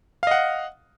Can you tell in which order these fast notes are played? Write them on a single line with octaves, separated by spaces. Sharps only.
F5 D#5 F#5